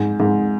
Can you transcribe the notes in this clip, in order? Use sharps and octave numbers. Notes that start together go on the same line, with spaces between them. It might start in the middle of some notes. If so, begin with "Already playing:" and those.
Already playing: G#2
G#2